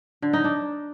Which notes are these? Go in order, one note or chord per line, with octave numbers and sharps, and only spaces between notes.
D3
D#4
D4